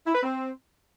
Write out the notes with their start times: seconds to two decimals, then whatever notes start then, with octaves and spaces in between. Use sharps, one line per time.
0.07 E4
0.15 B4
0.23 C4